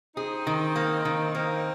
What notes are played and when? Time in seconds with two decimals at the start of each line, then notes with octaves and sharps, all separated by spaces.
0.16 C4 D#4 G#4
0.47 D#3
0.76 A#3
1.05 D#3
1.35 A#3 C4 D#4